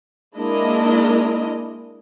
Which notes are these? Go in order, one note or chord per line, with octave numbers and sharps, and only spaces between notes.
G#3 A#3 D4 E4 A#4 D#5